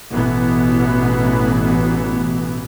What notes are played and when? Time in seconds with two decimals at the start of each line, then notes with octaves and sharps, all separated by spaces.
0.12 A1 B2 E3 B3